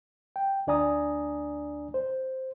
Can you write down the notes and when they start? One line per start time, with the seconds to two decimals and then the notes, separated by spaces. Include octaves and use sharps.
0.36 G5
0.67 D2 D4 D5 G#5 A#5 D#6
1.94 C5